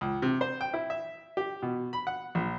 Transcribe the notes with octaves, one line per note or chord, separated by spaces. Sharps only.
C#2
C3
C5
G5
E4
E5
G4
B2
B5
F#5
A#1